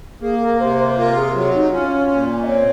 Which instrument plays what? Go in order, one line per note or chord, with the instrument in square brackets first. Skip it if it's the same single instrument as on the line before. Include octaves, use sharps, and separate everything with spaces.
[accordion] A#3 [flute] G#4
[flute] A#4
[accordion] C3 [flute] C5
[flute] C5
C5
[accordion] F4 [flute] A#4
[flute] G#4
[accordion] F#3 [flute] F4
[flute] D#4
[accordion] C#4 [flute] F4
[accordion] A#2
[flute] D#5
[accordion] C4 [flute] C#5